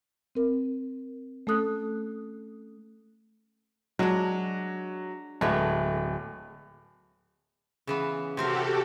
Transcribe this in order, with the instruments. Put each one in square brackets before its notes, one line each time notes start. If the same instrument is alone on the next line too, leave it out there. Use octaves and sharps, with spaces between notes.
[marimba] C4 A#4
A3 C#4 A4 D#6 F#6
[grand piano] F#3 [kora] G#3 D4
[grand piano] D1 [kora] G#3 A3 B3
[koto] C#3 E3 B3
[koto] C3 C4 A#4 [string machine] F#4 G4 A4